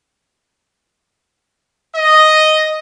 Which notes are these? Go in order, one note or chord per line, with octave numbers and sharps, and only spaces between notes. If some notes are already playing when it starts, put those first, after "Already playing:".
D#5